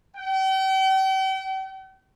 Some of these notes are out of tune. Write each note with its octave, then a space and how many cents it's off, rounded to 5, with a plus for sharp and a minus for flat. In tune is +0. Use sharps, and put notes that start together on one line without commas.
G5 -40